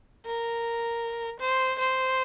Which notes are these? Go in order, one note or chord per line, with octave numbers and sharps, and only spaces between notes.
A#4
C5
C5